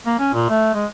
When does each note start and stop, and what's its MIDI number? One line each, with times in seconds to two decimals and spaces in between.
0.06 0.14 58
0.19 0.32 61
0.34 0.47 46
0.50 0.69 57
0.75 0.86 56